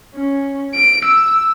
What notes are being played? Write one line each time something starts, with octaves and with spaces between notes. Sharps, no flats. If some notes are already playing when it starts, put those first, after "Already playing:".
C#4
D7
E6